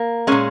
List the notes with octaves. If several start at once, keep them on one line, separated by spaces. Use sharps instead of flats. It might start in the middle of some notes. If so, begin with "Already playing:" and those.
Already playing: A#3
A#2 G#3 C#4